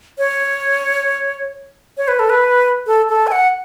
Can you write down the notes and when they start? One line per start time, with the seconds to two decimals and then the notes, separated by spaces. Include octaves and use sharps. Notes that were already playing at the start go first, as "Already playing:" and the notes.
0.18 C#5
1.97 C#5
2.08 B4
2.19 A4
2.30 B4
2.87 A4
3.09 A4
3.27 G#5
3.32 F#5